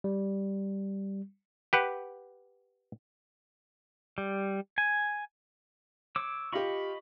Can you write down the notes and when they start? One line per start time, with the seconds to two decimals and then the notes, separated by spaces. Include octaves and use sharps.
0.04 G3
1.73 G4 B4 F#5
4.18 G3
4.78 G#5
6.16 C#5 D6 E6
6.53 F4 G4 D#5 B5 C#6